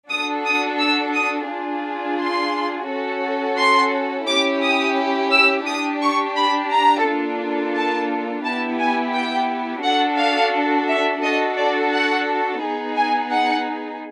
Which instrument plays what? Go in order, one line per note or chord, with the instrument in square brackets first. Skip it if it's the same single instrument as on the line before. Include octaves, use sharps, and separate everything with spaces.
[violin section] D4 F#4 A4 D#6
D#6
E6
D#6
D4 F4 G#4
C6
C#4 F#4 A4
C6
C#4 E4 G4 D6
D#6
E6
D4 G4 D#6
C#6
B5
A#5
A#3 D4 F4 A4
A5
B3 E4 G4 A5
G#5
G5
D4 F#4 A4 F#5
F5
E5
D4 F#4 A4 D#5
D5
F#5
B3 D#4 G#4
G#5
F#5